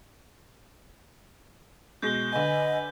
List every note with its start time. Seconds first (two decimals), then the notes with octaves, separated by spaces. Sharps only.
2.02 B2 G#3 G6 A#6 G7
2.32 D3 B4 D#5 G#5